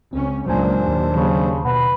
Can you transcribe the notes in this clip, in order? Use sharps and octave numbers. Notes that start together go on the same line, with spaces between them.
C#2 C4 C#4
C#2 A#2 F#3 A#3 D4 C5 G#5
D#2
C#3 F#3
B2 B4 F#5